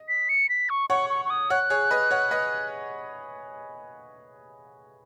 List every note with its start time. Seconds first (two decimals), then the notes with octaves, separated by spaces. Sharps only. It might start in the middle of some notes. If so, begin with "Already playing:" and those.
Already playing: D#5
0.08 B6
0.29 C#7
0.49 B6
0.69 C#6
0.90 C#5 F#5 C#6
1.10 C#6
1.25 C#6
1.30 D#6
1.50 C#5 F#5 F#6
1.70 G#4 C#5
1.91 B4 D#5
2.11 C#5 F#5
2.31 B4 D#5